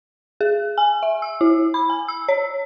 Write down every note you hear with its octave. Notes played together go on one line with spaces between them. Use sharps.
G#4
G#5
E5
E6
E4
B5
G#5
E6
C#5